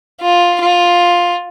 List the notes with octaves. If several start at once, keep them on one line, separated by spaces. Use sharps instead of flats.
F4
F4